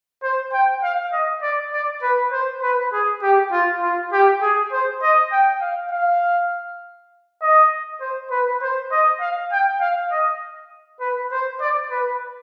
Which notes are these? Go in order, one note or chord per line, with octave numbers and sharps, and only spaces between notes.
C5
G5
F5
D#5
D5
D5
B4
C5
B4
G#4
G4
F4
F4
G4
G#4
C5
D#5
G5
F5
F5
D#5
C5
B4
C5
D#5
F5
G5
F5
D#5
B4
C5
D5
B4